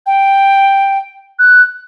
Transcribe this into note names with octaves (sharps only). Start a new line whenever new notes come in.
G5
F#6